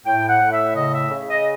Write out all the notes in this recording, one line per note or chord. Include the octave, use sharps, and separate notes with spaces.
A2 G5
F#5
A2
E5
C#3 D#5
E5
C#3
D#5